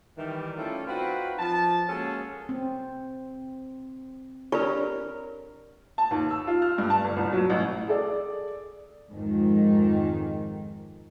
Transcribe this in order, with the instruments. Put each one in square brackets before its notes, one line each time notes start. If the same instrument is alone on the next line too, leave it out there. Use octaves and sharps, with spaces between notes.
[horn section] D#3 E3 G3
G3 A3 C#4 E4 F4 A4
C4 D#4 F4 F#4 B4
F3 A5
G#3 A#3 C#4 F#4 G#4 A4
[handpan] C4
[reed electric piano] D4 C#5 [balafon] G4 D5 B5 [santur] A#4
[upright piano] A5
D#2
E6
F4
F6
G2
A5
G1
C2
F#3
A1
[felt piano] G#4 A4 D5
[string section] F2 G#2 D#3